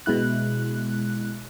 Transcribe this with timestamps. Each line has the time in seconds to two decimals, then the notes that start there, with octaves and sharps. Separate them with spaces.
0.06 B2 G#3 E4 F#6